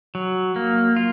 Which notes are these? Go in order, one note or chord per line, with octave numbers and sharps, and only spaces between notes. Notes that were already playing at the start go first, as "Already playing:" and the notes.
F#3
A#3
F4